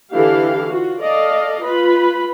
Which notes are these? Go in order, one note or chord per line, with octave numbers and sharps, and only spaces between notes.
D3 E3 G4 A4 F5
F4 F#4
A4 D5 D#5 F5
F4 B4 B5